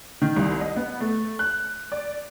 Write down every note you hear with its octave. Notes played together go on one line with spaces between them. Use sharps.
D#3
C2
D#5
B3
A3
F#6
D5